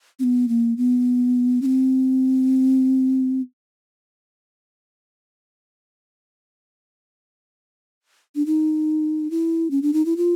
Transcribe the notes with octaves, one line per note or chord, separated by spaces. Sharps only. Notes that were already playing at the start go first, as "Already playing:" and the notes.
C4
B3
A#3
B3
C#4
C4
D4
D#4
E4
C#4
D4
D#4
E4
F4